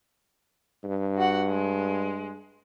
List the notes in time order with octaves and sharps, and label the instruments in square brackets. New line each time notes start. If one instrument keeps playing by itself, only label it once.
[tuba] G2
[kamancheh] F#4 F#5
G#3